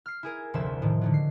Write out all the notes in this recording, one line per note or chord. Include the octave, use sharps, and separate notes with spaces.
F6 C7
E4 G#4 A#4
F1 D2 F3 C5 E5 E7
A2 D#3
D3 D#3 F#3
C7